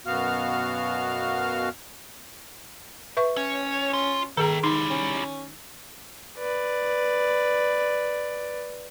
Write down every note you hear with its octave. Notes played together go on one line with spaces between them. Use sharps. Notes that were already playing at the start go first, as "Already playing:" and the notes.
F#2 B2 B3 F#4 F5 F6
B4 E5 C#6
C#4 C#5
F4
D#3 G#4 A4 G5 A#5
D#4 E4 G4 C6
C#4
B4 D5